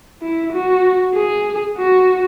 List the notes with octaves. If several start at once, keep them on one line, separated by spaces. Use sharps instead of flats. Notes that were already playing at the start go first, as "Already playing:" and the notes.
E4
F#4
G#4
F#4